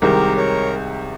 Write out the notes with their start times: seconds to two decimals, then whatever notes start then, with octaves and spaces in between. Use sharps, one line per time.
0.02 C2 C3 D#3 G#3 G4 A#4
0.37 A#4 C#5